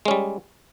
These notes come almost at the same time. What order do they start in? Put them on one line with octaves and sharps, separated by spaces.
G#3 C#4 G3